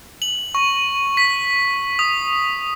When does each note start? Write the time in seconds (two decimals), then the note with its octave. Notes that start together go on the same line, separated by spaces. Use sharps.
0.22 F#7
0.55 C#6
1.17 B6
1.99 D#6